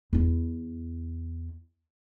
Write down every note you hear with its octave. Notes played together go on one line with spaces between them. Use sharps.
E2 E4